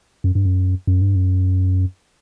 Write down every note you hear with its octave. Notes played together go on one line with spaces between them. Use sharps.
F#2
G2
F#2
F#2
G2
F#2